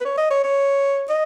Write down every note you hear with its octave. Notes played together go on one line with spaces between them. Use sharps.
B4
C#5
D#5
C#5
C#5
D#5